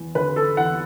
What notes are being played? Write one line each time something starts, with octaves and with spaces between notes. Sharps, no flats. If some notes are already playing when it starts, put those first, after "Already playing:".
Already playing: E2
D3 B4
A4
E2 F#5